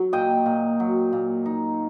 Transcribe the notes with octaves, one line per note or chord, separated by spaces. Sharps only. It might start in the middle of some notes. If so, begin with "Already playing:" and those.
Already playing: F#3
A#2 D#5 G5
A#2
F#3
A#2
D#4